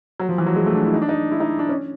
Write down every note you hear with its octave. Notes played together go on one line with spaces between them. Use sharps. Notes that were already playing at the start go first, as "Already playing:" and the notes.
F#3
F3
E3
F#3
G#3
A3
D4
E4
D#4
D4
D#4
E4
D#4
D4
C#4